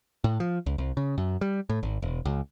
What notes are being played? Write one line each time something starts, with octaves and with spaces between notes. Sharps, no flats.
A2
F3
C#2
C2
C#3
F#2
G3
A2
G#1
E1
C#2